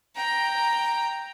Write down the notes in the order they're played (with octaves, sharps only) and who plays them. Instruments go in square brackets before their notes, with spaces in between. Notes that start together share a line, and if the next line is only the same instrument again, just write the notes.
[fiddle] G5 A#5